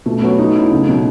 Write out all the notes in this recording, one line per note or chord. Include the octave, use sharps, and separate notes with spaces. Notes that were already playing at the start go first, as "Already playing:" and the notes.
B2 A3
F#3 B3 C#4 F#4 C#5
F#3 D#4
C#4 E4
C#2
B2 F#3